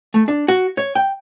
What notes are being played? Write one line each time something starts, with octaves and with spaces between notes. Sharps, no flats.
A3
D4
F#4
C#5
G5